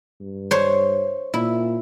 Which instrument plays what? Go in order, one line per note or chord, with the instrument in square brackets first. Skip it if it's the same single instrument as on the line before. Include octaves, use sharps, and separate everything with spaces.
[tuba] G2
[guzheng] C5 C#5
[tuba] A#2 [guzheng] E4